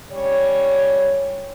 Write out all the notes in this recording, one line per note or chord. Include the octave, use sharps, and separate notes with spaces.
G3 C#4 C#5